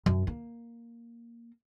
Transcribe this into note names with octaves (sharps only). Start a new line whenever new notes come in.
F#2
A#3